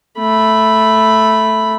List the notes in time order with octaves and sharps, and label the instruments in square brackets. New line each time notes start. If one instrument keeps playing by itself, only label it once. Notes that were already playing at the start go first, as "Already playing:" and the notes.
[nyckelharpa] A3 B5